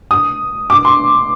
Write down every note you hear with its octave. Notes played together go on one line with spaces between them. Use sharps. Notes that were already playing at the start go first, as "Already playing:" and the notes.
D#6
D6
C6